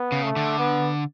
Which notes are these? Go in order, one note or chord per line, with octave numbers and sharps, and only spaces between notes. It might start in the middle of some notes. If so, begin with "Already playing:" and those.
Already playing: B3
C#3
A3
D3
B3